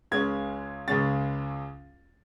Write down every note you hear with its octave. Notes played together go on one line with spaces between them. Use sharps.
C#2 C#3 G#3 C#4 G#6
C#2 C#3 G#3 C#4 A6